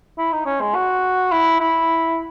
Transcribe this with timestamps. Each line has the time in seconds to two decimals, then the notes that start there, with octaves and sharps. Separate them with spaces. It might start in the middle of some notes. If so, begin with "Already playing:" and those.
0.18 E4
0.32 D#4
0.46 C#4
0.61 G#3
0.75 F#4
1.32 E4
1.60 E4